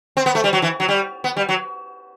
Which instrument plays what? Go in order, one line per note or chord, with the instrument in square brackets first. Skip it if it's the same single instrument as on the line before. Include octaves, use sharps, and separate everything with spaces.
[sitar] C4
B3
A3
G3
F#3
E3
F#3
G3
B3
G3
F#3